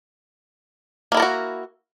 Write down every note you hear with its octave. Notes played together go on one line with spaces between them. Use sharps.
A#3 E4 F#4 A4 A#4